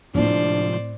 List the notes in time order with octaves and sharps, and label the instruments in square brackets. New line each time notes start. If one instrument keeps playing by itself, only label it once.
[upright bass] A2 C4 [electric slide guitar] C3 F3 G#3 [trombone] D4 [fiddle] C5 D5